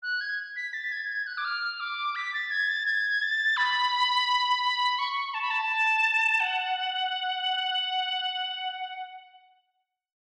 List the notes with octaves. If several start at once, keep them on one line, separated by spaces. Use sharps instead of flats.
F#6
G#6
B6
A6
G#6
G#6
F#6
D6
F6
D6
B6
A6
G#6
A6
G#6
A6
B5
C#6
A5
B5
A5
F#5